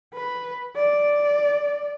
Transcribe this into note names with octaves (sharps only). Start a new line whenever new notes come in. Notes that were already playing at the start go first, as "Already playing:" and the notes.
B4
D5